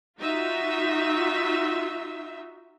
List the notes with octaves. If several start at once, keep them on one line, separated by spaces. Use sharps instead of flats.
D#4 F4 F#4 E5